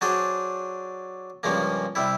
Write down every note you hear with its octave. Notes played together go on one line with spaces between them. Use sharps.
F#3 D4 G#4 C5 D5
G2 C#3 F3 G#3 A#3
C3 G3 E4